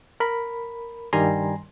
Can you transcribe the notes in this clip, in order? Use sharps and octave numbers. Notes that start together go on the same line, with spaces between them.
A#4 B5
G2 D#3 G3 G#5 A#5 C6